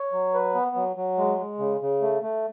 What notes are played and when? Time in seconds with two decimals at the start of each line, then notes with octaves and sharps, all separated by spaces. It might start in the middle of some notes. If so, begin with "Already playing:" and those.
Already playing: C#5
0.12 F#3
0.34 B4
0.55 B3
0.76 F#3
0.96 F#3
1.18 G#3
1.39 G#3
1.59 C#3
1.81 C#3
2.02 A3
2.23 A3